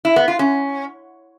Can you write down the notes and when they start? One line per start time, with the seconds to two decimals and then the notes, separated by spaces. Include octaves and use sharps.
0.05 E4
0.16 B3
0.28 F4
0.39 C#4